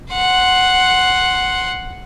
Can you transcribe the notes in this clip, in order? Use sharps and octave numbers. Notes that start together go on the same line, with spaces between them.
F#5 C6